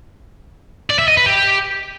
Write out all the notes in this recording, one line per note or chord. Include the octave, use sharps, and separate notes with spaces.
D5
E5
D#5
B4
G4